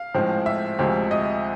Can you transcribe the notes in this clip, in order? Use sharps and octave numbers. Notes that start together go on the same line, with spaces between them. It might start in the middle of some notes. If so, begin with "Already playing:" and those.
Already playing: F5
A2 F3 G#3 C4
E5
D2 C3 F3 G#3 C4
D#5